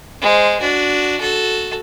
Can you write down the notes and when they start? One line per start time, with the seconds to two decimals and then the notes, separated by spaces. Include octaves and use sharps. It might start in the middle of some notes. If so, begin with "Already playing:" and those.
0.20 G#3 C5
0.59 D4 F#4
1.20 F#4 A4